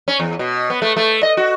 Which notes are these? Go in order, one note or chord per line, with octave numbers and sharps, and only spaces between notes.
C#4
E2
B2
B3
A3
A3
D#5
F#4